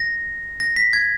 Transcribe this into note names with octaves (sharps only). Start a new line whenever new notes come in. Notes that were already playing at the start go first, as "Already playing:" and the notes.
Already playing: A#6
A#6
B6
G#6